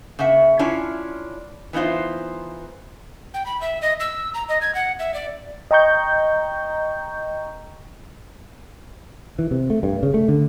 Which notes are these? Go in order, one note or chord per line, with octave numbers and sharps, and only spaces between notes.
C#3 A#3 E5 F#5
C#4 D4 E4 F4 C#5
E3 B3 D#4 F4 C5
G5
B5
E5
D#5
E6
A#5
D#5
G#6
F#5
E5
D5
D#5 G5 A#5 C#6 G6
E3
C3
A3
G2
C#3
A3
D3